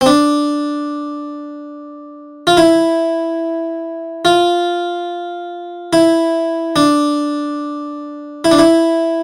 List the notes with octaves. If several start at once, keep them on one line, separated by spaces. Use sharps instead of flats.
C4
D4
F4
E4
F4
E4
D4
E4
D4
E4